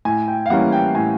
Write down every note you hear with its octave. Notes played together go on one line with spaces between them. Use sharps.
A2 G#5
G5
F5
E3 G3 A#3 C#4 F#5
G5
A2 G#5